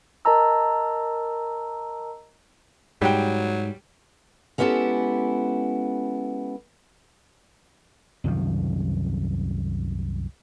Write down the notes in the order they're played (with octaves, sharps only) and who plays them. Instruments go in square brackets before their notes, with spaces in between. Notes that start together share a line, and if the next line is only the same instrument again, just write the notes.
[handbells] A#4 D#5 A5 A#5 E6
[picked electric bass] G#2 [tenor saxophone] F#3 [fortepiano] G3 G5
[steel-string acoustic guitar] G#3 B3 C#4 E4 G4 A4
[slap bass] C2 F#2 D#3 F3